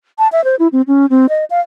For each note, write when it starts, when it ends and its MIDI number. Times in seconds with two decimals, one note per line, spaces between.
0.18 0.28 81
0.32 0.43 76
0.44 0.55 72
0.59 0.68 64
0.72 0.82 60
0.87 1.06 61
1.10 1.26 60
1.29 1.45 75
1.50 1.60 77